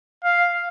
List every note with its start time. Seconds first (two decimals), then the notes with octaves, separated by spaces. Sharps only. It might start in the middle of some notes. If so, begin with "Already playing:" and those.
0.24 F5